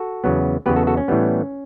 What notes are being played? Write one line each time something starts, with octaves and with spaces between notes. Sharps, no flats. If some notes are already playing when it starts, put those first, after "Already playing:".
Already playing: F#4 A4
E2 C#3 F#3 B3
E2 C#3 F#3 B3 G4 B4
F#4 A4
F#4 A4
C#4
A2 E3 G3 B3